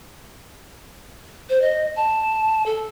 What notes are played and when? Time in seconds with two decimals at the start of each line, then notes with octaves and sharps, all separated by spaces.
1.49 C5
1.62 D#5
1.96 A5
2.66 A4